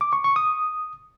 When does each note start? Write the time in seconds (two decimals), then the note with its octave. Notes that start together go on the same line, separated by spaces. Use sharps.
0.01 D6
0.13 C#6
0.24 C#6
0.36 D#6